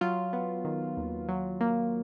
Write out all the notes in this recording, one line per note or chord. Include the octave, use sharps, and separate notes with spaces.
F#3 F4
B3
D#3
D#2
F#3
A#3